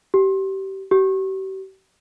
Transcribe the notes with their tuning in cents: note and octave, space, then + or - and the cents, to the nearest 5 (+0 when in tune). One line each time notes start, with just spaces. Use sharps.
G4 -25
G4 -40